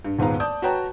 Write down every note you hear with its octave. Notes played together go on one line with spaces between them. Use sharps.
G2
D#1 G#2 B3 F5 A#5
D5 A5 D#6 G6
F#4 B4 C#5 G5 A5 A#5